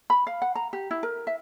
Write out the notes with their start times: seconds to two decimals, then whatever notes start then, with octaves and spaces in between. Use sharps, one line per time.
0.10 B5
0.27 F5
0.42 F#5
0.55 A#5
0.73 G4
0.91 E4
1.03 A#4
1.27 E5